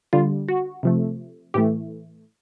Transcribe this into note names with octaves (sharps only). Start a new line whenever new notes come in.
D3 G3 F4
F#4
C3 F3 A3
A2 E3 A3 G4